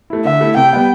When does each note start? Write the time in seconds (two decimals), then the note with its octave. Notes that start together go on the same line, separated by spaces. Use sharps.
0.10 A3 E4
0.25 D3 E5
0.41 A3 E4
0.56 C3 G5
0.73 G3 B3